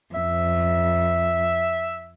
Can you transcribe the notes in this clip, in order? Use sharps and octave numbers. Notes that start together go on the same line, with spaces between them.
F2 E5